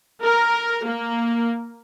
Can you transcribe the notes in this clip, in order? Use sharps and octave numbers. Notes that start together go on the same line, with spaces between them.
A#4
A#3